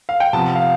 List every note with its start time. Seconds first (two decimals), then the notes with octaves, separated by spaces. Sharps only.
0.09 F5
0.20 G5
0.33 C3 F3 B3 A5
0.56 F5